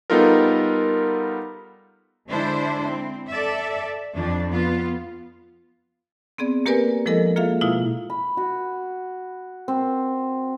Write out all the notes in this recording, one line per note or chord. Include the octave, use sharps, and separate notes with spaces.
G3 B3 D#4 F4 A4 A#4
D3 G#3 D4 E4 C5
C4
A4 D5 E5
F2 D4
B3 F4
B3 C4 G#4 D5
A#3 G4 A#4 B4 D5 G#5
F3 G#3 E4 A4 A#4 D#5
A#3 F4 G#4 A4 E5 F5
B2 G#3 E4 F4 F5
B5
F#4
C4